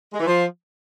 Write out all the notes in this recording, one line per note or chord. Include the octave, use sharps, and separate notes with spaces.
G#3
E3
F3